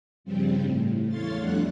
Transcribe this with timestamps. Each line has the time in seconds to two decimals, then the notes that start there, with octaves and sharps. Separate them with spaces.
0.24 G2 C#3 F3 G3 C4
0.61 A2
1.08 E2 A3 C#5 F5 C6 A6
1.39 F2 G3 A3 D4 F#5 F#6